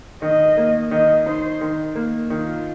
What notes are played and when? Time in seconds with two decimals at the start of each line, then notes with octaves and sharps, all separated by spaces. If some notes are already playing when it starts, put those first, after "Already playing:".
0.22 D#3 D#5
0.57 A#3
0.91 D#3 D#5
1.26 D#4 C5
1.61 D#3
1.95 A#3
2.30 D#3 F4